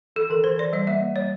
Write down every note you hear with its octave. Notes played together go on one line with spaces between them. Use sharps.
E3 A4
E3 A#4
E3 C5
E3 D5
G3 D#5
A#3 E5
A#3
G3 C#5